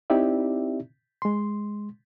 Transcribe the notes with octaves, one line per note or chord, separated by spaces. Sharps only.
C4 D#4 E4 G4 D5 E5
G#3 C6